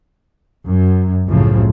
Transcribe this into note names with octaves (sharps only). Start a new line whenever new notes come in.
F#2
C2 F#2 A2 C#3 F3